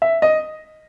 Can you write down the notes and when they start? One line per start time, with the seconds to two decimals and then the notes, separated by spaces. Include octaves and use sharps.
0.02 E5
0.22 D#5